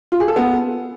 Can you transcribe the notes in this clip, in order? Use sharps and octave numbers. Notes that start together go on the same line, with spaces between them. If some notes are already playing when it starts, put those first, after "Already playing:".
F4
G#4
A4
B3